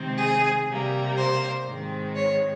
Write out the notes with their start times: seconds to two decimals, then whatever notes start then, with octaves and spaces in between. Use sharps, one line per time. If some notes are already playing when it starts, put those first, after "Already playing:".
Already playing: C3 D#3 G#3 C4
0.17 G#4
0.67 C3 G3 A#3
1.17 C5
1.66 G#2 D#3 G#3 C4
2.15 C#5